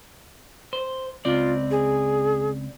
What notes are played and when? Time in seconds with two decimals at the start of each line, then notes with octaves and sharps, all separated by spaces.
0.73 C5
1.25 C#2 C4 F4 D5
1.71 G#4